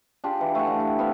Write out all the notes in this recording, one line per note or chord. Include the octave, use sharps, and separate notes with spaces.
D4 F4 G4 G#4
E3
A3 F#5
D3 F5
E4 G4
B3 C4 E5 F5